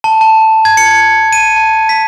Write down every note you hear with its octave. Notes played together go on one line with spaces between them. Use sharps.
A5
A5
G#6
C#7
C#7
D#7
A5
B6